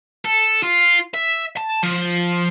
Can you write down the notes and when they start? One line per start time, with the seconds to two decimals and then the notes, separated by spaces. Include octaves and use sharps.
0.25 A4
0.63 F4
1.14 E5
1.57 A5
1.83 F3